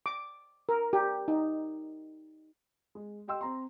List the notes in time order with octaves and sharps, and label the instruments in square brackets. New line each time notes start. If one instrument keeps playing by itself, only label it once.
[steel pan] D6
A#4
G4
D#4
[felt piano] G#3
G4 D#5 G5 C6 E6
C4 A#5 C6